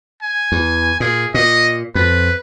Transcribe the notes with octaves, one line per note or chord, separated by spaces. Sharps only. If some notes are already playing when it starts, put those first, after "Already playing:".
G#5
E2
A#2 G#4
A#2 D#5
F2 B4